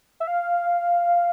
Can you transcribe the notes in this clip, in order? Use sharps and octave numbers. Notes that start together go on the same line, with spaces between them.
E5
F5